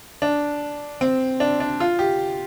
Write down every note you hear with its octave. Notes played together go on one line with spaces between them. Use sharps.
D4
C4
D4
D4
F4
G4